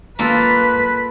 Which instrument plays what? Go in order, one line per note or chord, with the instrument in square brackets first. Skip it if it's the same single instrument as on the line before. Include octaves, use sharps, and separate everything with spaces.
[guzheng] A#3 F4 A4 [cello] B4